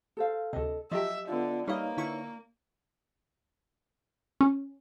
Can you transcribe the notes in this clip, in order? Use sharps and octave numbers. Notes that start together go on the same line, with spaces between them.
A4 C5 F5
D2 C3 A4 D#5
F3 F#3 G4 D#5 E5
D3 B3 F4
G3 A#3 D#4 E4 B4 C#5 D#5 F5
D3 E4 C#6
C#4